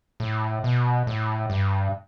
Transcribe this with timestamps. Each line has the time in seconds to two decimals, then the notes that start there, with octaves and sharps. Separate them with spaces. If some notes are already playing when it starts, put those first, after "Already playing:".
0.20 A2
0.64 B2
1.07 A2
1.50 G2